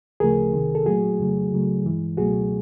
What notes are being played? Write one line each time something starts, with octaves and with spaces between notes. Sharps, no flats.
D2 C#3 F3 A3 G#4 A#4
C2 C3 D#3
A4
A#2 F#3 A3 F#4 G#4
F2 C#3 F#3 A3
C#2 C#3 F#3 A3
G2 E3 G#3
C#2 B2 F#3 A3 F#4 G#4